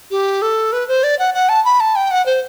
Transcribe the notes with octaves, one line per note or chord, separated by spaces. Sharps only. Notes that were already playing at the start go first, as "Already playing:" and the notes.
G4
A4
B4
C5
D5
F#5
F#5
A5
B5
A5
G5
F#5
C5